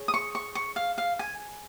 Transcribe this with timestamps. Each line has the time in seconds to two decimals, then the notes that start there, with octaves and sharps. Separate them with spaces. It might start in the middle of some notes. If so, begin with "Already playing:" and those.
Already playing: G#4 C#5
0.08 D#6
0.14 C#6
0.35 C#6
0.55 C#6
0.76 F5
0.98 F5
1.19 G#5